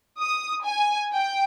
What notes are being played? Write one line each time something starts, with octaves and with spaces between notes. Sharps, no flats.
D#6
G#5
G5